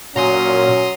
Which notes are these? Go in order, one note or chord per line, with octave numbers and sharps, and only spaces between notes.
A#2 F#3 C#4 A#5 C6 D#6